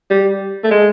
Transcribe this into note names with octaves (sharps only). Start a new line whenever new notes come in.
G3
A3
G#3